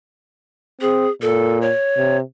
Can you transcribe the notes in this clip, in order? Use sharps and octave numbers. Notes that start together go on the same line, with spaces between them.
C4 G#4
A#2 A4
C#5
C3